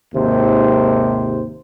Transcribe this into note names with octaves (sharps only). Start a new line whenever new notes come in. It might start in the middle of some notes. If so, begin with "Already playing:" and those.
G#1 D#2 C3 C5